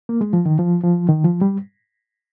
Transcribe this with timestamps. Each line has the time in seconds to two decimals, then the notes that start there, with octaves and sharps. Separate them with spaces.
0.09 A#3
0.21 G#3
0.33 F3
0.46 D#3
0.59 F3
0.84 F3
1.09 D#3
1.24 F3
1.41 G3